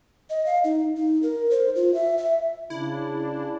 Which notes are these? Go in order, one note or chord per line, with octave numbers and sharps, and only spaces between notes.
D#5
F5
D#4
D#4
A#4
C5
F4
E5
E5
C#3 D4 E4